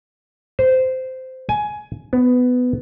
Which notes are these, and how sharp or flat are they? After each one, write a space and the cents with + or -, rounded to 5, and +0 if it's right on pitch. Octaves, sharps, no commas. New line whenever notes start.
C5 -15
G#5 +15
B3 +15